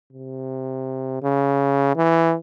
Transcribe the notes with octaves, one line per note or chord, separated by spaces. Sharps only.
C3
C#3
E3